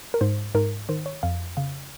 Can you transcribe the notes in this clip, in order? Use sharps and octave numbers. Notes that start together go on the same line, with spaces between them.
A#4
G#2 C5
G#2 A#4
D#3 C5
C#5
F2 F5
C#3 F5